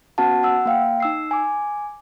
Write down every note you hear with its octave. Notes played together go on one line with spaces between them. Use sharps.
B3 C#4 F#4 F#5 A5
F#5 E6
A#3 F5 G5
D#4 E6 C7
G#5 D6